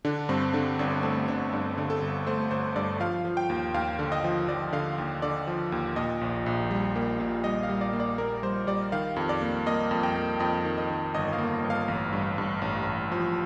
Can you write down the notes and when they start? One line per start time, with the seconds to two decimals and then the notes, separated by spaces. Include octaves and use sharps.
0.05 D3 D4
0.29 G2 C4
0.53 D3 D4
0.79 G1 D4
1.03 A3 C4
1.28 G1 D4
1.52 G2 D4
1.77 D3
1.90 A4
2.02 G1
2.27 A3 C5
2.51 G1 C5
2.76 G2 D5
3.00 F3 F5
3.25 F3
3.37 G5
3.50 D#2
3.74 D#2 F5
3.99 D3
4.12 D#5
4.24 F3
4.48 F3 D5
4.73 D3 F5
4.98 D#2
5.22 D3 D5
5.47 F3
5.72 D#2
5.96 A#2 D#5
6.21 A#1
6.46 A#1
6.71 G3
6.96 A#3
7.20 A#2
7.44 G3 D#5
7.63 F5
7.69 G3
7.81 D5
7.93 A#3
8.00 D5
8.18 A#3 A#4
8.43 G3 C5
8.67 G3 D5
8.92 D#3 F5
9.16 F2
9.29 D5
9.42 A#3
9.66 A#3 D#5
9.91 F2
10.03 G5
10.16 A#3
10.40 F2 D#5
10.65 D#3
10.78 D#5
10.90 D#3
11.14 G1 D#5
11.33 F5
11.38 A#3
11.64 G1
11.70 F5
11.88 A1
12.13 G2
12.38 G2
12.62 A1
12.87 A1
13.12 F3